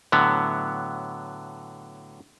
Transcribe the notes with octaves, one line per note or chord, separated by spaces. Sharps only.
A2 D3 F#3 B3